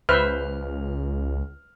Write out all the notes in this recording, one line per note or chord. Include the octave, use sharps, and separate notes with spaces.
C#2 B4 C5 E5 F6